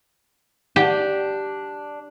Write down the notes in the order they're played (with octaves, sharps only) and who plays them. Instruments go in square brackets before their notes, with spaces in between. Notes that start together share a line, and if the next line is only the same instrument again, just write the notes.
[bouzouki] D4 [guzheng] G4